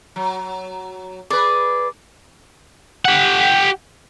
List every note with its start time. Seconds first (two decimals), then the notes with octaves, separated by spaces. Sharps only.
0.16 F#3
1.30 G#4 B4 D5
3.05 G4 F#5